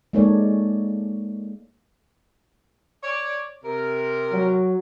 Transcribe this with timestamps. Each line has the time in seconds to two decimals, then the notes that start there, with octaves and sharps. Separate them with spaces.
0.13 G#3 A#3 D#4 A4 C#5 D5
3.03 C#5 D5
3.64 C3 A#4
4.33 F#3